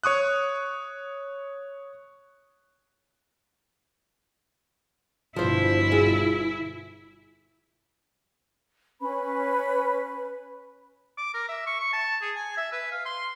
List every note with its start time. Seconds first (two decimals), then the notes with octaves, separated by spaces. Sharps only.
0.04 C#5 C#6 D#6 F#6
5.36 G1 B2 F3 E4 C5
5.91 F4 G#4
9.00 C#4 B4 B5
11.17 D6
11.34 A#4
11.49 E5
11.67 C#6
11.80 C#6
11.93 A5
12.22 G#4
12.35 G#5
12.57 E5
12.72 B4
12.92 F5
13.05 C6